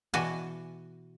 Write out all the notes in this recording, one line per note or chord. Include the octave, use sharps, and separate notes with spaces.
B2 E3 F#4 D5 G#5